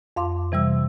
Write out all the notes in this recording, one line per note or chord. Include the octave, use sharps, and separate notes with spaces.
F2 F5 C6 D6
C3 E3 G3 E6